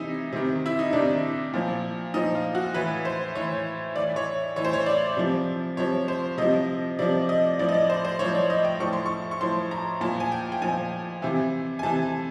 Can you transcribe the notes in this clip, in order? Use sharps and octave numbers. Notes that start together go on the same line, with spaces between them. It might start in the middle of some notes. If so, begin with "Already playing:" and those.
Already playing: C3 E3 D#4 E4
C3 D#3
E4
D#4
C3 D#3 D4
A#2 F3
A#2 F3 D#4
F4
F#4
A2 E3 B4
C5
A2 E3 C#5
A2 E3 D5
C#5
A2 E3 C#5
C5
C#5
D5
C3 F3
C3 F3 C#5
C5
C3 F3 D#5
C3 F3 D5
D#5
A2 F3 D5
D#5
D5
C5
C5
A2 F3 C#5
D5
D#5
G5
A2 F3 C#6
C6
C#6
C#6
A2 F3 C6
A#5
A#2 F3 A5
G#5
G5
G5
A#2 F3 G#5
C3 E3
G#5
C3 E3 A5